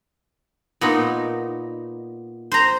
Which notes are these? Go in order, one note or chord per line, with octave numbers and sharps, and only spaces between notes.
A#2 B3 D#4
C5 A#5